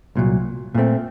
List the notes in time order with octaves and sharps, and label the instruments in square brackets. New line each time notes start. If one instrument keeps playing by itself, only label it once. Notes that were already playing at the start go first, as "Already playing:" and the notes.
[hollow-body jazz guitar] C2 A#2 F#3
A#2 A3 C4